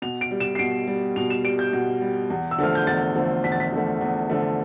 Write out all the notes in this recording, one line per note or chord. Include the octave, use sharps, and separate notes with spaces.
B2 F7
D7
G3
E7
C7
B2 D7
G3
B2 F7
E7
G3 D7
G6
B2
G3
E2
E6
D3 F3 A3 F6
G6
E2 A6
D3 F3 A3
E2 B6
A6
B6
D3 F3 A3
E2
D3 F3 A3